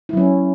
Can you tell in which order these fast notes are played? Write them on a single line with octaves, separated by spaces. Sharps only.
E4 F#3 C#4